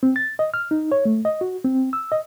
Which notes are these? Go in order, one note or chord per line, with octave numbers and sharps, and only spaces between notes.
C4
A6
D#5
F6
D#4
C#5
A3
D#5
F#4
C4
E6
D#5